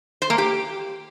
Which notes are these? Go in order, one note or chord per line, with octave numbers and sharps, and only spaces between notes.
C5
A#3
G4